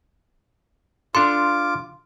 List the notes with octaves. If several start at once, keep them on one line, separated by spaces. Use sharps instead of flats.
D4 F4 A4 C6 D6